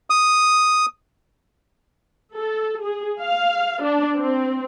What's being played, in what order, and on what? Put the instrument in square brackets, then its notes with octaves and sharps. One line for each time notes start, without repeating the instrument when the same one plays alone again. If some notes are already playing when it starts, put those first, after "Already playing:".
[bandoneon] D#6
[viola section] A4
G#4
F5
D4
C4